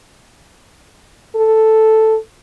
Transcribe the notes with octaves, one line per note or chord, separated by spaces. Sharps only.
A4